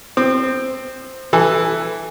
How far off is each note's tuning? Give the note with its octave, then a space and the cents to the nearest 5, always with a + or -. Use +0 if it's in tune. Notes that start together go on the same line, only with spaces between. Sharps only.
C4 +0 D#6 -40
E3 +0 A4 +0